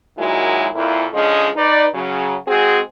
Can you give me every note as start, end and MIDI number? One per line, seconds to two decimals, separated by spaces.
0.18 0.67 46
0.18 0.67 51
0.18 0.67 54
0.18 0.67 56
0.18 0.67 64
0.18 0.67 66
0.74 1.06 41
0.74 1.06 46
0.74 1.06 64
1.13 1.49 50
1.13 1.49 53
1.13 1.49 56
1.13 1.49 61
1.13 1.49 75
1.56 1.86 63
1.56 1.86 71
1.56 1.86 74
1.94 2.35 49
1.94 2.35 54
2.48 2.80 56
2.48 2.80 60
2.48 2.80 66
2.48 2.80 68